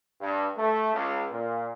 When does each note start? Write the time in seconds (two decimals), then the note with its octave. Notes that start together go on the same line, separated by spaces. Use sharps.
0.21 G2
0.57 A3
0.93 C#2
1.31 A#2